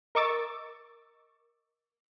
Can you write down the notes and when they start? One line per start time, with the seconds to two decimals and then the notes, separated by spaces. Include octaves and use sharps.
0.15 A#4 D#5 C#6 D6 E6 A6